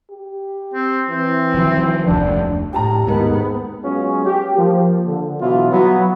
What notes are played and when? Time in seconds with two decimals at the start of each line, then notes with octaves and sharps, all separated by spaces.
0.10 G4
0.74 C4
1.09 E3 C4
1.54 D#3 F3
2.06 F1 D2 F3 D4
2.73 A2 G4 G5 A5 A#5
3.07 D#2 G#2 D#3 B3
3.84 F#3 G#3 B3 C#4 F4 G#4
4.25 G4
4.57 F3 A#3
5.06 D3
5.40 B2 E3 F#3 B3 E4 F4
5.71 F#3 B3